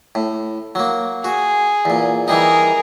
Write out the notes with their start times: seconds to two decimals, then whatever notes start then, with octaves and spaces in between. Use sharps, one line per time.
0.15 A2
0.75 F#3 A#3
1.24 F#4 G#4
1.85 E2 A#2
2.28 E3 G3 D#4 G#4 A#4